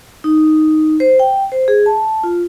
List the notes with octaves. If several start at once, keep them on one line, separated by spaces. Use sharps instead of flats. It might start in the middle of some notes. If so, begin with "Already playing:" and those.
D#4
C5
G5
C5
G#4
A5
F4